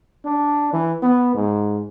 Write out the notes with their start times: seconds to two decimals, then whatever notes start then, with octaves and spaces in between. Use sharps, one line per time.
0.25 D4
0.73 E3
1.02 B3
1.34 G#2